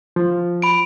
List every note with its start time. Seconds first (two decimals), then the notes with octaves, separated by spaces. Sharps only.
0.16 F3
0.62 B5 D7